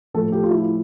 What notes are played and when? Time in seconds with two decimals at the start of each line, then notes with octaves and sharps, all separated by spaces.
0.14 A2 F3 A3 A4
0.32 G4
0.43 F4
0.51 E4